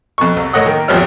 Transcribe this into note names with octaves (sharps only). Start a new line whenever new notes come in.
F2 B2 C#6
C2
A2 A3 C#5 D#5 F#5 D#6
D#3 A#3
G#1 D2 F3 G3 C#5 F6